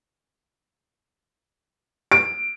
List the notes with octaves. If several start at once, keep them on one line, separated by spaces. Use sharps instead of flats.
D7